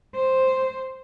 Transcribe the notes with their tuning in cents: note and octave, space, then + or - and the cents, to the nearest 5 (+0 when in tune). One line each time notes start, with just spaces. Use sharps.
C5 +0